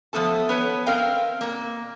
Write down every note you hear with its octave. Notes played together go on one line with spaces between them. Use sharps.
F3 A3 B3 A4 A5
B3 B4 C#5
C4 A#4 D#5 F5 G5
A#2 A#3